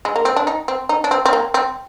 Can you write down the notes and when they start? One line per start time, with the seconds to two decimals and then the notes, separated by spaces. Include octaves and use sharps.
0.05 G#3
0.16 A#3
0.25 C4
0.36 D4
0.47 D#4
0.68 C4
0.89 D#4
1.04 D4
1.11 C4
1.25 C4
1.33 A#3
1.54 C4